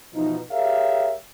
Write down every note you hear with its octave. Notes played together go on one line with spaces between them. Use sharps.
B2 E3 F3 D#4
G4 G#4 A#4 C#5 E5 F5